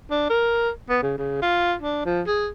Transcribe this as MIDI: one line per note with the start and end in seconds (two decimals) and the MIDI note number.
0.11 0.25 62
0.30 0.70 70
0.90 1.00 59
1.02 1.14 49
1.18 1.39 49
1.42 1.74 65
1.82 2.02 62
2.05 2.22 53
2.27 2.48 68